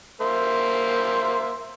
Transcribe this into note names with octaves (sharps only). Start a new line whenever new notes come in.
A#3 C5 E5